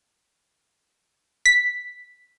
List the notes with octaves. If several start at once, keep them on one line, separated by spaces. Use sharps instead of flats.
B6